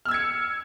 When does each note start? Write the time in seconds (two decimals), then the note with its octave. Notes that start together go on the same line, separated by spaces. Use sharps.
0.05 F6
0.08 E6
0.11 G#6
0.14 C#7